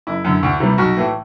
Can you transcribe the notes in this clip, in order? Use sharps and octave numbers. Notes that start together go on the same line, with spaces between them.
F#1 E4
F#2 D3
D2
C3 E3 G3
B1 F#4
A2 E3 A3